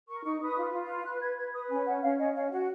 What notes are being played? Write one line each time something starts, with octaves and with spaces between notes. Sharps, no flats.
A#4 C#6
D#4 C#6
B4 D#6
F4
F4
B4
B4 F#6
B4 G#6
B4 G#6
B4 D#6
C#4 G#5
C#4 F#5
C#4 F5
C#4 D#5
C#4 F5
F#4 F#5